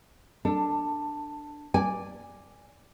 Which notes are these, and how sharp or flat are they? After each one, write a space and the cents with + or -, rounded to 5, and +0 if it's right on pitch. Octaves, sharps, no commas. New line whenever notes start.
D4 +10 A4 +25
D5 +0 G#5 -15